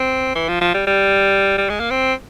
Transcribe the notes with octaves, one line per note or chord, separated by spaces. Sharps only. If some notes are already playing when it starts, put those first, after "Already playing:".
Already playing: C4
E3
F3
F3
G3
G3
G3
G#3
A#3
C4